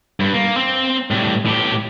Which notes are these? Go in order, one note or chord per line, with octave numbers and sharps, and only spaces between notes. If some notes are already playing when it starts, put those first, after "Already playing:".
G2
A#3
C4
A2 G3
A2 G4